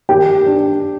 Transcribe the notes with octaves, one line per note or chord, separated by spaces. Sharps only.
D#3 G4 G5
D4